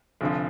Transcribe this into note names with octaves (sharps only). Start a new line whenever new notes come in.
F1 F2 D3 F3